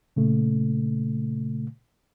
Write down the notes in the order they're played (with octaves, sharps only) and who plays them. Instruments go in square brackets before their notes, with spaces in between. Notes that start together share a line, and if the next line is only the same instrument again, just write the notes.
[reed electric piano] A#2 C#3 A3